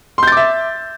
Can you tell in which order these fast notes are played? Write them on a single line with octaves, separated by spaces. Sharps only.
C6 G6 A6 D6 E5